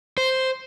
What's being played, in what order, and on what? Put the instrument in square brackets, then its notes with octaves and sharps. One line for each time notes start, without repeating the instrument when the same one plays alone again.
[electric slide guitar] C5